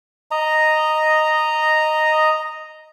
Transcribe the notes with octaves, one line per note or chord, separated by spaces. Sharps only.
D#5 A#5